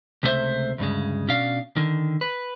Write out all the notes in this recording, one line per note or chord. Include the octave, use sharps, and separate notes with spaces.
C#2 C3 A3 D#4 C5 E5
D2 G2 C#3 G#3
B2 C#4 D4 F5
D3 D#3
B4